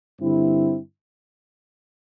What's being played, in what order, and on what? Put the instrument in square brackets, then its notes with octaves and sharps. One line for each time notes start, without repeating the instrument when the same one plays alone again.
[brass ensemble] G2 D3 C4 E4